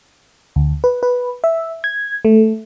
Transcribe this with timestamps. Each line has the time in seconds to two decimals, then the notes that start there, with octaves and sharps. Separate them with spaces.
0.56 D2
0.84 B4
1.03 B4
1.44 E5
1.84 G#6
2.25 A3